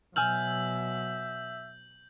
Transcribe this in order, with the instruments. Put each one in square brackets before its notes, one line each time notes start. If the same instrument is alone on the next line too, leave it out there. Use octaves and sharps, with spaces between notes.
[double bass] B2 F#3 [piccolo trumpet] E5 [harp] G#5 E6 F6 [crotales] G6 F#7